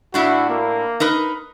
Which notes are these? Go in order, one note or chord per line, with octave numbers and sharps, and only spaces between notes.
A2 D4 E4 F#4
A#3
D#4 A#4 B4